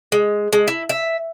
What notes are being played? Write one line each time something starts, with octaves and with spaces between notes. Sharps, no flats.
G#3
G#3
E4
E5